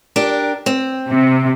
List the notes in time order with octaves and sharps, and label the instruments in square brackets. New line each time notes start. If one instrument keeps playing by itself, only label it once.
[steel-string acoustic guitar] D4 G4 A#4
C4
[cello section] C3